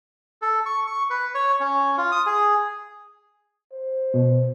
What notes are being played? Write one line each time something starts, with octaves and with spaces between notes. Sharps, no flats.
A4
C#6
C#6
B4
C#5
C#4
F4
D#6
G#4
C5
B2